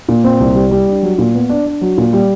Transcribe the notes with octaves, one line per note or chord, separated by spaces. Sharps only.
A#2
C4
C2
G3
G3
D4
F#3
A#2
B3
D4
D4
F#3
A#2
G3